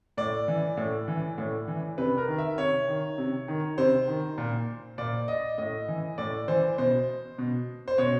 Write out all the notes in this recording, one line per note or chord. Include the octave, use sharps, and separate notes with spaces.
A2 D5
E3
A2
E3
A2
E3
C3 B4
A#4
D#3
E5
C3 C#5
D#3
C3
D#3
C3 C5
D#3
A#2
A#2 D5
D#5
A2 D#5
E3
A2 D5
E3 C5
B2 C5
B2
C5
B2 C#5